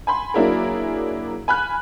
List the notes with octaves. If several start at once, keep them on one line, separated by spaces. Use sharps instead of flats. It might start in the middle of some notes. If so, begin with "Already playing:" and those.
G#5 B5 C6
F#3 A#3 D4 E4 G#4 A#4
G#5 B5 F6 F#6